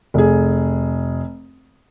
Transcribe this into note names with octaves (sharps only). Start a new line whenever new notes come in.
F1 G#4